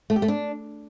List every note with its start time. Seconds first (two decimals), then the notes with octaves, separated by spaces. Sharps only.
0.10 A3
0.16 G4
0.22 A3
0.28 D4